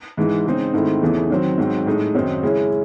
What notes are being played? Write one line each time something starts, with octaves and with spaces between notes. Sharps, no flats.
G#2 E3 G#3
C#3 G#3 C4 D#4
G#2 D#3 A3 C4 E4
E2 C#3 E3 A3 D#4
D#3 F#3 C4
G#2 F#3 C4
A2 G#3 D#4
F#2 D#3 F#3 C4 D#4
C#3 G#3 C#4 E4